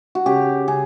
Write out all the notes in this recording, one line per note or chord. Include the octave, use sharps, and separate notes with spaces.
F#4
C#3 G4
C#3 G#4